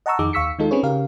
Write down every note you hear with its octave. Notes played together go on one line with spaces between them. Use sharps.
D#5 F#5 A5 A#5 C#6 E6
F2 D#3 D#4 G#4 D6
D#2 F5 C#6 E6 B6 C#7
D#3 G#3 D#4 F4 A4
C4 C#4 D#4 G#4 B4 C#5
C#3 G4 A#4 F5